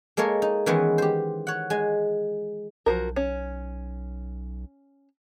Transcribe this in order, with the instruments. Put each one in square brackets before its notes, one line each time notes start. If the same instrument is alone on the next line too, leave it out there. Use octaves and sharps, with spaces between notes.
[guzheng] G#3 A#3 A4 A#4 C#5
D#4
D#3 E3 G#3 B3 C#4
G4 C5
C#5 F#5
G#3 G#5
[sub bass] B1 [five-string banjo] F3 F#4 A#4
[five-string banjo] C#4